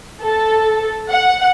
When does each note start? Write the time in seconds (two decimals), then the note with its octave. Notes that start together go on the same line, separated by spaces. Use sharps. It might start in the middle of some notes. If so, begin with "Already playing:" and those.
0.22 A4
1.09 F#5